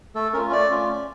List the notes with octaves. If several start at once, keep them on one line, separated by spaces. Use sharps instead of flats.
A3 A4
C#4 F4 A#4
A3 D5
C#4 F4
C#4